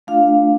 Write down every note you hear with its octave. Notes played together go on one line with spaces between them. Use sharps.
A3 D4 F4 F5